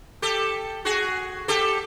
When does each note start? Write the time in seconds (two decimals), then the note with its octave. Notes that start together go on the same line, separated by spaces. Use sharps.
0.22 G4 A4
0.85 F#4 G#4
1.48 G4 A4